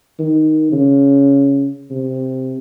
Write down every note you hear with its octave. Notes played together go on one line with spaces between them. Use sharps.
D#3
C#3
C3